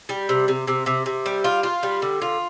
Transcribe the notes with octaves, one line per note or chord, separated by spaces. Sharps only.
G3
C3
C3
C3
C3
C3
G3
F4
F4
G3
D3
F4